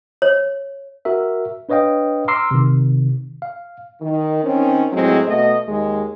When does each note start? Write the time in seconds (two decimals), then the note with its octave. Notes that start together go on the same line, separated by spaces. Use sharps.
0.22 C#5
1.05 F#4 A#4 E5
1.69 D4 B4 C#5 D#5 F5 G5
2.28 A#5 C6 D6 E6 F6 C7
2.51 C3 D#3
3.42 F5
4.02 D#3
4.44 D#3 C4 C#4
4.93 A2 F#3 G#3 C4
5.27 B2 A3 D#5
5.68 D#2 G#3